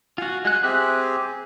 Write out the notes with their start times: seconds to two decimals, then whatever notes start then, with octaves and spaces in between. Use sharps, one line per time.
0.18 F4 F#4 F5 F#5 G#5
0.45 G#3 F#5 G#5 F#6
0.63 C4 G4 G#4 E5 G#5 F#6